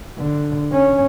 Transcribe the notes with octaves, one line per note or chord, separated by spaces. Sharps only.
D3
C#4